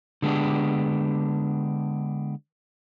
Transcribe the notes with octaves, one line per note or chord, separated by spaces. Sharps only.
D3 G#3 B3 D4 G4